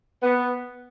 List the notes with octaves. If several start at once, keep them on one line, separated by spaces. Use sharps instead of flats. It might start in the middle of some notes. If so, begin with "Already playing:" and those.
B3